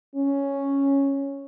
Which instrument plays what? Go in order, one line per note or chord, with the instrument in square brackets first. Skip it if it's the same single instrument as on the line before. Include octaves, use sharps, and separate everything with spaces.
[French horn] C#4